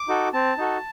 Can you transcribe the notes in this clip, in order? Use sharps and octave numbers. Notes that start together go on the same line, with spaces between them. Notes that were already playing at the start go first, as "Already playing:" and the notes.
Already playing: D6
D#4 F#4 A4
C4 A5
D#4 F#4 A4